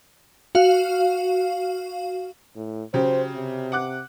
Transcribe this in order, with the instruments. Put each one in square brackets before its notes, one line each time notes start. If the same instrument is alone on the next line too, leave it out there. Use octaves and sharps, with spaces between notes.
[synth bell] F#4 F5
[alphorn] A2
[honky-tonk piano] C#3 F#3 G4 [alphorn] C5
[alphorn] C3
[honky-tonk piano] F#5 D6 F#6